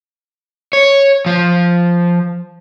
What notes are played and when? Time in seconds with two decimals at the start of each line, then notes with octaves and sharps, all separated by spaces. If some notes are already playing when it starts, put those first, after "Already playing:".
0.73 C#5
1.26 F3